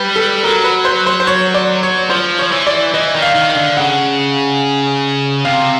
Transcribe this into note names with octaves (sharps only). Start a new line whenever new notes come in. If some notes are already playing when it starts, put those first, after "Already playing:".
Already playing: G3 B4
A4
F#3 A#4
B4
C5
C5
C5
C#5
D5
C#5
F3 C5
F3 C#5
E3
D5
E3 D#5
D#3
F5
D#3
F5
D3
C#3 F#5
C3 F5